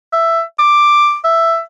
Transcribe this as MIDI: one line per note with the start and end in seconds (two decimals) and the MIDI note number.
0.13 0.42 76
0.59 1.16 86
1.24 1.60 76